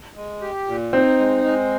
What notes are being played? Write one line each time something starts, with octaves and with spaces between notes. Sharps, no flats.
G#3
G4
A#2
C4 D#4
G#3
G#3